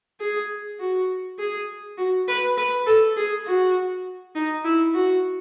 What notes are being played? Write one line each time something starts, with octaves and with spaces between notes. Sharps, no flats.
G#4
F#4
G#4
F#4
B4
B4
A4
G#4
F#4
D#4
E4
F#4